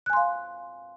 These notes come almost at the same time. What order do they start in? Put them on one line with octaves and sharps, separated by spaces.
F#6 G#5 C6 F5